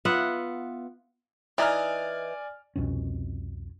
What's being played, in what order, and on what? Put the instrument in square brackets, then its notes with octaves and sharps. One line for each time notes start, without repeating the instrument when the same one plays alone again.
[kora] B3 F4 E5 F#5
[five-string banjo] E3 D#4 [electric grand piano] D5 G#5 F6
[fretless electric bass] C2 F2 B2 C#4